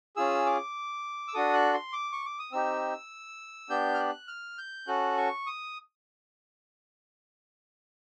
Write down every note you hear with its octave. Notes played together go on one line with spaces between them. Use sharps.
C#4 F4 G#4 E6
D6
E6
D4 F#4 A4 D#6
F#6
C6
D6
C#6
D6
D#6
C4 D#4 G4 E6
B3 D4 G4 G6
F6
F#6
F6
G6
C#4 F#4 A4 F#6
C#6
D#6